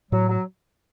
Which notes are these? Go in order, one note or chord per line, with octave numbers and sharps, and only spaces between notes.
A2 F#3
F#3